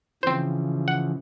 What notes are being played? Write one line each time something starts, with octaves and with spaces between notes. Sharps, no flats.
C#3 E3 F3 C4 C5
F#5